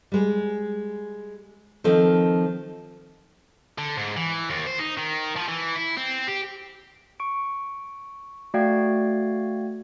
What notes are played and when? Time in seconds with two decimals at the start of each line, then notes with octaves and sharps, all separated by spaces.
0.12 G3 G#3
1.84 D#3 F3 C4 A4
3.78 D3
3.97 G#2
4.17 E3
4.50 D#2
4.67 C5
4.79 D#4
4.98 D#3
5.36 F3
5.49 E3
5.76 E4
5.97 C4
6.28 G4
7.20 C#6 D7
8.54 A3 F#4 D5 F5 G5 G#6